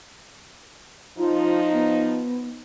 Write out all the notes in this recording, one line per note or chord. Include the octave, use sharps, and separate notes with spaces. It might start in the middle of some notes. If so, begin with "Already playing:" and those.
F3 D#4 F4
B3